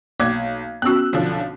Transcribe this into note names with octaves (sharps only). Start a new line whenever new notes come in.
B1 A#3 D5 D6 G#6
B3 C#4 F#4 E6 F#6
B1 D3 F3